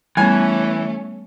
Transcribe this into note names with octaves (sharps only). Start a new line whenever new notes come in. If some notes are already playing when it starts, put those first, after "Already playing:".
E3 G3 A3 B3 C#4 G#5